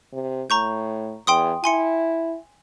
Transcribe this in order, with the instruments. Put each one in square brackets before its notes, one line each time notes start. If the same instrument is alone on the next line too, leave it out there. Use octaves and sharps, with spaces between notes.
[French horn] C3
[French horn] A2 [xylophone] A#5 C#6 G6
[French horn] E2 [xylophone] G5 C6 D#6
[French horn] E4 [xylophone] G#5 C6 C#7